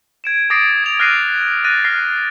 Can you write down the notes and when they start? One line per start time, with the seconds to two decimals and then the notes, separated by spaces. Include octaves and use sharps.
0.24 G#6 D7 E7
0.50 D6 D#6 A6 A#6 C7 D7
0.84 G#6 F7
1.00 F6 F#6 A#6 C7 D7 D#7
1.64 F#6 A6 A#6 D#7
1.84 F6 A#6 C7